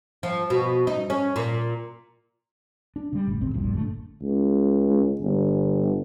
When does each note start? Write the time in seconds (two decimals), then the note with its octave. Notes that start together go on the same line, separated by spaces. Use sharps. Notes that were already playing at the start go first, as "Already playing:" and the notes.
0.23 F3
0.50 B2
0.87 D#4
1.10 C#4
1.36 A#2
2.96 D4
3.13 C#3 G3
3.27 G1 A2
3.41 G#1 D2 C#3 C4
3.54 E1 A#1 G2 A#2
3.73 F#1 A2 D3 A3
4.22 C#2
5.21 G1